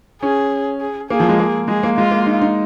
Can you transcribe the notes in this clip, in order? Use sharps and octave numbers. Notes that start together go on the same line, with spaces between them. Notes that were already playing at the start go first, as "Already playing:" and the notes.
C#4 G#4
G#4
A#3 G#4
F3
G#3
A#3
G#3 G#4
A#3
G#3 F4
A#3
D#4
D#4